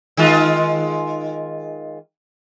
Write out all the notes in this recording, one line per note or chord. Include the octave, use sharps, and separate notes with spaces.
D#3 G#3 F4